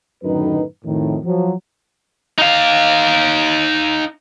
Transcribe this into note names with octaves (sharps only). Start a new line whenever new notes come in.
F#2 A2 D3 D#3 D#4 B4
F2 A2 D#3
F3 F#3
D#4 F5